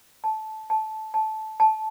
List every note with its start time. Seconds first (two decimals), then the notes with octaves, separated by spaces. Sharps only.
0.24 A5
0.70 A5
1.14 A5
1.60 A5